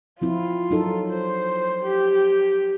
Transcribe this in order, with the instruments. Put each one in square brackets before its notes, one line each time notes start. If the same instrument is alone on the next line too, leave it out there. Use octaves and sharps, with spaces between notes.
[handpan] F3 C4 E4 [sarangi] F4
[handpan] F#3 D#4 A4
[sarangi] C5
G4